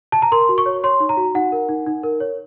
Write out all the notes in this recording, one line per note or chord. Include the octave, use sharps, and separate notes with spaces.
A5
A#5
A#4 C6
F#4
C#6
C#5
C#5 C6
D#4
A#5
F#4
D#4 F#5
A#4
D#4
D#4
A#4
C#5